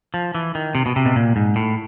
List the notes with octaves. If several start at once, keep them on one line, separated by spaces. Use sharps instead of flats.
F3
E3
D#3
C3
B2
C3
B2
A#2
G#2
A2